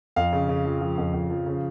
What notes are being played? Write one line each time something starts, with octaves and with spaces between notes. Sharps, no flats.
F2 F5
C#3
C#3
F3
F3
F2
F2
F3
C#3